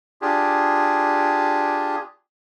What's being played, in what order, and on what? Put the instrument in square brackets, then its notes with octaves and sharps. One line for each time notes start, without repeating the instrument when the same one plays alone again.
[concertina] D4 F4 G4 G#4